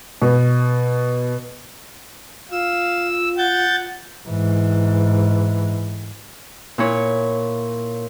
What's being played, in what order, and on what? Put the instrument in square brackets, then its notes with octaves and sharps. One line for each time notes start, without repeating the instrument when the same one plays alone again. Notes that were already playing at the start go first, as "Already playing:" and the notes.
[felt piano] B2
[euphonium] F4 [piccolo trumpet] F5 [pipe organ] E6
[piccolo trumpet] F#5 [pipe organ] G6 A6
[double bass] G#2 E3
[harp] A#2 E4 C#5